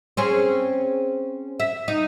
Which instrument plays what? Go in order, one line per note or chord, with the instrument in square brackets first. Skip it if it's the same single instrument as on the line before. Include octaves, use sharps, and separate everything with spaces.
[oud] C4 C#4 G#4
E5
D#4